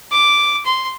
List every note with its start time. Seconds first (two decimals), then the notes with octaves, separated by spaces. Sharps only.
0.12 D6
0.66 C6